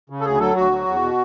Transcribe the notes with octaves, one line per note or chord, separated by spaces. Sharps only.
C#3
A4
D2 G#4
F#3 A4
D2 F#4
F#3
E2
B2